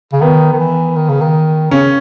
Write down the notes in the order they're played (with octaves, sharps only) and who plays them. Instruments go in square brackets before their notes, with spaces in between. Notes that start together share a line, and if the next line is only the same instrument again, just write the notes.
[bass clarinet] C#3
[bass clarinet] D#3 [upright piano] B3
[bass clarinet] D#3
E3
D#3
C#3
D#3
[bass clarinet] C#3 [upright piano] C#4